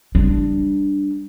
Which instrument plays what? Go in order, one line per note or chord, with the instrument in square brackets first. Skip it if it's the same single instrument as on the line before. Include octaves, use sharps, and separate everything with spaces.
[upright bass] G3 D4